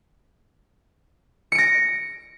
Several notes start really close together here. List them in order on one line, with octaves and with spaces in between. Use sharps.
C#7 D7 A#6